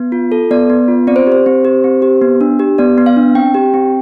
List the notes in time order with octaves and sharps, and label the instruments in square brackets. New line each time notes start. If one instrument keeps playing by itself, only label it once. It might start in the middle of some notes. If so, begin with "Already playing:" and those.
Already playing: [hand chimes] B3
F4
A4
B3 D5
B3
F4
C4 D5
C5
G4 C5
C4
G4
C4
G4
B3
D4
G4
B3 D5
B3
F5
D4
C4 G5
G4
C4